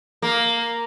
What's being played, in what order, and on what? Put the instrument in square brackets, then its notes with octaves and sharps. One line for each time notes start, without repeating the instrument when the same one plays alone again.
[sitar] A#3